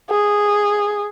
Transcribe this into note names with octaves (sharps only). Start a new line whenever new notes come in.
G#4